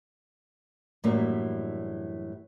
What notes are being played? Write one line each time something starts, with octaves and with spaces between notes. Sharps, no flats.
F#2 A2 E3 G3 A#3 D4